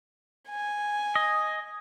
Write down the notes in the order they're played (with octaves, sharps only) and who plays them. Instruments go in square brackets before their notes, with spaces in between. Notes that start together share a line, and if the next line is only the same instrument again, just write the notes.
[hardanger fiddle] G#5
[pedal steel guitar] D#5